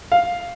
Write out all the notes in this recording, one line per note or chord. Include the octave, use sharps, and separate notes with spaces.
F5